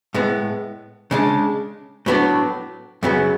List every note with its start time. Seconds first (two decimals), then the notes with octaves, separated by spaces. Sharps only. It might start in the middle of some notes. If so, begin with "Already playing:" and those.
0.14 A2 G#3 B3
1.11 C#3 G#3 D4
2.06 A2 F#3 B3 D4
3.03 F#2 C#3 F#3 B3